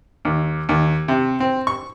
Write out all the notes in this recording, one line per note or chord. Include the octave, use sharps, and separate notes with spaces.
D#2
D#2
C3
C4
C#6